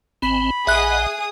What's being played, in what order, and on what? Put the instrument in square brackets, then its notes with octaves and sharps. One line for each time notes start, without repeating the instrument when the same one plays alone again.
[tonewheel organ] G#1 C4 [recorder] B5
[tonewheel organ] A#1 D#5 F#5 [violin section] G#4 D#6 [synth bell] E5 F#6